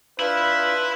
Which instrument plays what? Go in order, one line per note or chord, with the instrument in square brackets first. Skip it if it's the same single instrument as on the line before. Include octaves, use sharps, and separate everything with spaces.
[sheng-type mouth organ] D4 F4 G6 [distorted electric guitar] E4 [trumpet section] B4